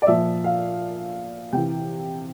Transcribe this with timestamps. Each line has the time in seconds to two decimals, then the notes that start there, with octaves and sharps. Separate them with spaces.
0.02 D5
0.07 A#2 F3 E5
0.44 F5
1.53 C3 E3 G5